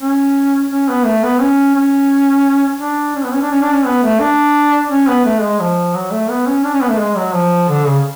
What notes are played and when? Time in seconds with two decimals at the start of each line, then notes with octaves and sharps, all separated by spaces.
0.01 C#4
0.72 C#4
0.89 B3
1.05 A3
1.23 B3
1.41 C#4
1.75 C#4
2.81 D4
3.16 C#4
3.25 B3
3.33 C#4
3.42 D4
3.51 C#4
3.62 D4
3.73 C#4
3.86 B3
4.03 A3
4.20 D4
4.90 C#4
5.07 B3
5.25 A3
5.42 G#3
5.60 F3
5.95 F#3
6.12 A3
6.30 B3
6.47 C#4
6.64 D4
6.73 C#4
6.81 B3
6.90 A3
7.00 G#3
7.17 F#3
7.33 F3
7.69 D3
7.87 C#3